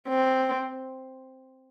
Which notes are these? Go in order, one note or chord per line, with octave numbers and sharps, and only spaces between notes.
C4